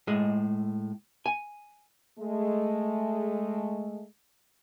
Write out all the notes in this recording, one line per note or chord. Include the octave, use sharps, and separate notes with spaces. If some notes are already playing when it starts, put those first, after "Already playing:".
A2 G#3 G#4 D#5
G#5
G#3 A3